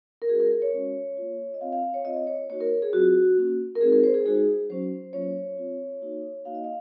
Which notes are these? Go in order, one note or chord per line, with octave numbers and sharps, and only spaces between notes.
A#4
G#3 C#4 F#4 G#4
A#4
A#4
C#5
G#3 C#4 F#4
A#3 F4
D#5
C4 F4 F5
F5
F5
C#5
C4 F4 D#5
D#5
C#5
A#3 D#4 F#4 C#5
A#4
G#4
F#3 C4 F4 F#4
A#3 C#4 F#4
A#4
G#3 C4 D#4 F#4 G#4
A#4
C5
G#4
G#3 D#4 F#4 G#4
F#3 C#4 F#4 C5
F#3 A#3 C#4 F4 C#5
C4 F4
A#3 D#4 F#4
A#3 D#4 F#4 F5
D#5
F5